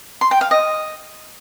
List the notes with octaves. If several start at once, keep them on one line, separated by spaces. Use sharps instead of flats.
C6
G5
F5
D#5